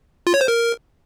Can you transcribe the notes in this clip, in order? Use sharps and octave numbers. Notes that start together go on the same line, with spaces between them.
F4
C#5
C5
A#4